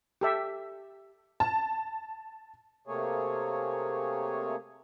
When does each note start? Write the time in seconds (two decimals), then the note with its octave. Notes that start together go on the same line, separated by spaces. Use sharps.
0.21 G4 A4 E5
1.40 A5
2.87 C3 A3 A#3 G#4 C#5